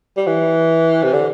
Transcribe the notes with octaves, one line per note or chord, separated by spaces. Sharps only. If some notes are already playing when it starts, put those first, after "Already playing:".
G3
E3
C3
D3